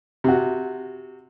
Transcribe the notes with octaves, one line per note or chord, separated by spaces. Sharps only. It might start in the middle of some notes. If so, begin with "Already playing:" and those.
C3 F#4